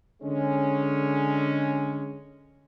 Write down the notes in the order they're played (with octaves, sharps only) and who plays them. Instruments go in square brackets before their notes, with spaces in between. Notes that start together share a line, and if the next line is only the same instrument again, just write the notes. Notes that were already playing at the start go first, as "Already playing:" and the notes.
[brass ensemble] D3 G#3 C#4